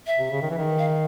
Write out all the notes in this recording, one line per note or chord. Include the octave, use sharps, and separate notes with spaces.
E5
C3
C#3
D#3
E3
D#3
F5